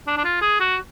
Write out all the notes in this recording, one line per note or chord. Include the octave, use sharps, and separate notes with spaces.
D4
D4
F4
G#4
F#4